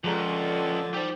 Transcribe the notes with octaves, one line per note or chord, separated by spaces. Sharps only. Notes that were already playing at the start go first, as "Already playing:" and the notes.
C#2 A#2 D3 F3 G#3 G#4 A#5
D#4 G4 C5 D5